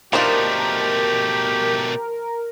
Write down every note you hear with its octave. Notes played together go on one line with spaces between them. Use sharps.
B2 F3 A3 D4 D#4 G4 A#4